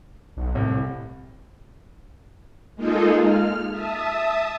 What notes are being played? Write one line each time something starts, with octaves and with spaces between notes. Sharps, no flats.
B1
C2 A2
G#3 A#3 D#4 F4 G#4 A4
F6
E5 A5 D#6